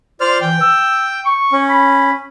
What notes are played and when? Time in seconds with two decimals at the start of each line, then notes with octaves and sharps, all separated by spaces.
0.21 F4 C5 D5 F6
0.41 E3 G5
0.61 E6
1.25 C#6
1.53 C#4
1.69 B5